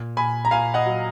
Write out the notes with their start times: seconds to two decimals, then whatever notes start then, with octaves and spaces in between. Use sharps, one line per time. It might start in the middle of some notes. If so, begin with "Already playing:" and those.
Already playing: A#2
0.17 A#2 G#5 B5
0.45 A#5
0.51 A#2 F5 G#5
0.74 D#5 F#5
0.86 F#3